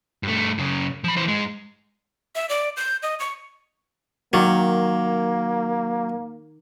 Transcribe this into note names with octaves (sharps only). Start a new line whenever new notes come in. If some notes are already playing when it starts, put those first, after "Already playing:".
G2 A3
F#2 C#3
F3 B5
E3 C5
G#2 G#3
E5
D5
G6
D#5
C#6
D#3 F#3 A#3 D5 F5